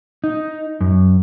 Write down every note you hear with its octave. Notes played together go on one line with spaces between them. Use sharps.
D#4
F#2